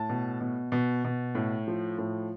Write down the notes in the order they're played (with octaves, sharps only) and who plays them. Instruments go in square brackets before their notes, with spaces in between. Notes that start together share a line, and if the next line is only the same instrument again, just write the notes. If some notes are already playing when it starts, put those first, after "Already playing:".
Already playing: [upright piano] A2 A5
B2
B2
B2
B2
A2
F3
A2